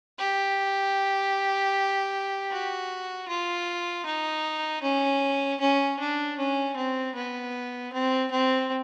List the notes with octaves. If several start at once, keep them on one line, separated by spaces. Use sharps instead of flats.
G4
F#4
F4
D#4
C#4
C#4
D4
C#4
C4
B3
C4
C4